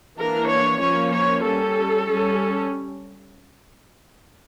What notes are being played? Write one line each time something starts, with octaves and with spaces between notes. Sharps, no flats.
E3 A#3 D4 A#4
C#5
F3 A#3 C#4 C#5
C#5
G3 C#4 A4
G3 C#4